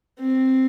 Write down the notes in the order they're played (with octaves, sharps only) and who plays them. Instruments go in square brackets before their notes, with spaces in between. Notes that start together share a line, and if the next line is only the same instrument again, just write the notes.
[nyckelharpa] C4